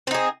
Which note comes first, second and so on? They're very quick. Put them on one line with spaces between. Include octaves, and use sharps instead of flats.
C4 D#4 G#4